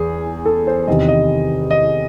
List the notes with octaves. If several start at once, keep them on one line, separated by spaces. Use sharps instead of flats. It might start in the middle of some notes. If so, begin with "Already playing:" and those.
Already playing: E2 G#4
A4
C5
E2 C3 D#3 D#5
D#5
D#5